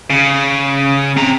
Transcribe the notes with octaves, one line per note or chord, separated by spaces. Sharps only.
C#3
C4 A#5